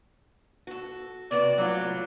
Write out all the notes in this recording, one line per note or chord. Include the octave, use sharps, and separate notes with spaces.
F#4 A4
C3 B3 F#4 D5
A2 F#3 F4